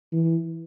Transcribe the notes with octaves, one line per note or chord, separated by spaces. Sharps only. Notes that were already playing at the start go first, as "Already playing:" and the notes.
E3